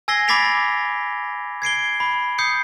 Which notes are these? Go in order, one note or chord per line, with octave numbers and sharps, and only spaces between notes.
G#5 E6 G#6 A#6 C7 G7
B5 D6 A6 B6 D7 F7
G#6 C7 D7 G7
B5
D#6 G6 C7 C#7